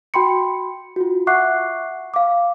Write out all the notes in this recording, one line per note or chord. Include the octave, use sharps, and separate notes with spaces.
F#4 G5 B5 C6 C#7
F4 F#4
E5 F#5 C#6 D6 F#6 C7
F5 D6